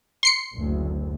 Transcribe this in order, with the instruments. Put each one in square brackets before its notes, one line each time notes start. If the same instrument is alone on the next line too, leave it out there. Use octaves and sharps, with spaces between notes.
[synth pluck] C6 C7 C#7
[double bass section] F#1 D2